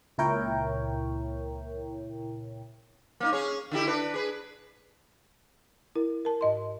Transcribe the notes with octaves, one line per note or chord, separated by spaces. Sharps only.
C#2 A#2 E4 A#4 C#5 G5
A#3 C#4 D#4
C#4 G#4 C#5
D3 E4 G4
D4 B4
G#4 B4
E4 A#4
A#4 A5
G#2 D#5 C6